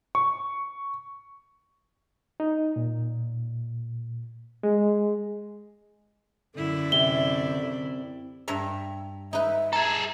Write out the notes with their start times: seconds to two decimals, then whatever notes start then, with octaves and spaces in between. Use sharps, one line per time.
0.15 C#6
2.40 D#4
2.76 A#2
4.63 G#3
6.56 F#2 D3 E4 D5
6.92 C3 G7
8.48 G2 E5 A#5
9.33 D#4 B4 E5
9.73 G#4 A4 A#5